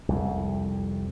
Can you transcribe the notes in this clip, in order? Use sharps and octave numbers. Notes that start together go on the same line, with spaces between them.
C2 F2